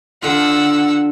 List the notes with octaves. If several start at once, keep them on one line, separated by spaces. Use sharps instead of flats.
D3 F4 F#5 E6